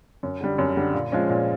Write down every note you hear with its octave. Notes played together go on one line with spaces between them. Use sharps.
F#2
D3 G3
F#2
D3 G3
A#2
F3 G#3 C#4
A#2